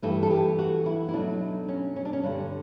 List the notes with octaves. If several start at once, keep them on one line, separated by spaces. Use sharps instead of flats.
G2 E3 A3 A4
A4
G4
F#4
E4
E4
B2 F#3 A3 D4
C#4
C#4
D4
C#4
G2 D3 G3 D4